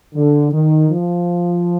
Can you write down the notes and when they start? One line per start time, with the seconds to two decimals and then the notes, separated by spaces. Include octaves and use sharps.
0.15 D3
0.53 D#3
0.89 F3